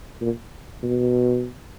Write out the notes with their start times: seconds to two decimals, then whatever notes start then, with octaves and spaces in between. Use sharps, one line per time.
0.21 A#2
0.83 B2